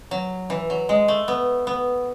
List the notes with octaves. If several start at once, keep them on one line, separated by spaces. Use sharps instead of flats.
F#3
E3
F#3
G#3
A3
B3
B3